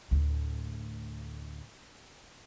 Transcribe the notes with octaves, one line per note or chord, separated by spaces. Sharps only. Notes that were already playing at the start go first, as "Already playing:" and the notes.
D2 A2